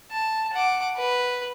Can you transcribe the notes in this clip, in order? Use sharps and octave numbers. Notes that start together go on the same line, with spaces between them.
A5
F#5 D6
B4